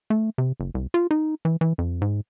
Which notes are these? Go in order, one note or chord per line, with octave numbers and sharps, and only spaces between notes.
A3
C3
F#1
C2
F4
D#4
E3
E3
F2
G#2